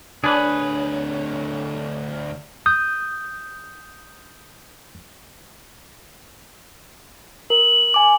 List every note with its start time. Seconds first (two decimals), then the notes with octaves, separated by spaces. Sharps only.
0.24 D2 D4 G#4 B4 C#5
2.66 D#6 G6
7.50 A#4 F#7
7.94 G#5 D6